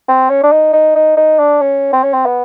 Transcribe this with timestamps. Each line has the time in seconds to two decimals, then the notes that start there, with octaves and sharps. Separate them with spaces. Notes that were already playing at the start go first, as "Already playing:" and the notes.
0.09 C4
0.30 C#4
0.43 D4
0.52 D#4
0.73 D#4
0.95 D#4
1.17 D#4
1.39 D4
1.61 C#4
1.93 C4
2.03 C#4
2.13 C4
2.26 B3